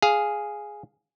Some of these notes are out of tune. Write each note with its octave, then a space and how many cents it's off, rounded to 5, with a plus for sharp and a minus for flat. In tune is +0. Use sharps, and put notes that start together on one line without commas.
G#4 +0 F5 +0